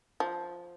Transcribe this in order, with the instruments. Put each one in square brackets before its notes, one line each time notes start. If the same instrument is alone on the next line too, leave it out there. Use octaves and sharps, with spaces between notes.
[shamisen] F3